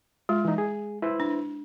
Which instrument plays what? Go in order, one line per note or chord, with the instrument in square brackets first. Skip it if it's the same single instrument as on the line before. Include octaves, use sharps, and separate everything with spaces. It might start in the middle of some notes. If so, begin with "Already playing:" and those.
[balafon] G#3 [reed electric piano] F4
[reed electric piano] E3 D#4
G#4
E4 B4 C5
[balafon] D4